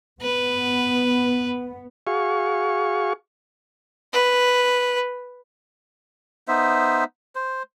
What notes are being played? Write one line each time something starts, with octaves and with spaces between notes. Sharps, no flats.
B3 B4
F#4 G#4 F5 C#6
B4
B3 D#4 C5 E5
C5